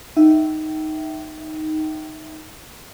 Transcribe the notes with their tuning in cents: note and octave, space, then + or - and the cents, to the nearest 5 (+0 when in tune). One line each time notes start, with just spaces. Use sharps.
D#4 +0 E5 +0 G5 -25